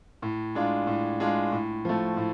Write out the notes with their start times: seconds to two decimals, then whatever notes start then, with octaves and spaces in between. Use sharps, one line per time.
0.22 A2
0.55 G#3 D4 F4
0.87 A2
1.20 G#3 D4 F4
1.52 A2
1.85 F3 A3
2.17 A2